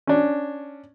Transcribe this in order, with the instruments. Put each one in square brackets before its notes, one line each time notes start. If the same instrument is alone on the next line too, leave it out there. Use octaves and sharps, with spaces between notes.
[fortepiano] C#4 D4